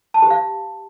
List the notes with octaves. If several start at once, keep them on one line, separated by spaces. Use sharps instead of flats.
A5
G4
F5